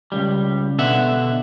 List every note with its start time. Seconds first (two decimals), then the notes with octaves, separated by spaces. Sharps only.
0.12 C#2 F#2 G3
0.79 B2 D3 E5 F#5